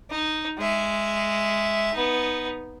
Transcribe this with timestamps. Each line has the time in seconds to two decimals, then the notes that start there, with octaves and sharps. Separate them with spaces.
0.10 D#4
0.58 G#3 E5
1.93 B3 D#4